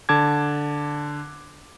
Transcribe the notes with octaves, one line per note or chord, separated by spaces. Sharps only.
D3 A5 D6 G#6